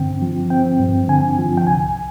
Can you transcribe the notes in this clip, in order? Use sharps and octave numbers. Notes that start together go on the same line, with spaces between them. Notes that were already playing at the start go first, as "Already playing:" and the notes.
Already playing: G2 D3 C4 G5
F3
C4 G5
G2
D3 G#5
F3
G5
C2 G#5